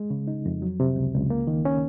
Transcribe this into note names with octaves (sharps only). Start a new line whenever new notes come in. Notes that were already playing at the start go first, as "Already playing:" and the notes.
Already playing: G#3
C#3
D#4
F2
F#3
C3
C#2
C#2
A#3
D#3
C#4